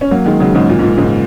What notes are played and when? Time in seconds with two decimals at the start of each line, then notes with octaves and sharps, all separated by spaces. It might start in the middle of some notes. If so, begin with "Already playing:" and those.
0.01 C#4
0.11 F#3 A#3
0.26 D#3 G#3
0.40 C#3 F#3
0.54 G#2 C#3
0.69 A#2
0.79 G#2
0.83 A#2
0.97 G#2 C#3